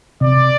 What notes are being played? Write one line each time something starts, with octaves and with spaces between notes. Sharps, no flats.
C3 D5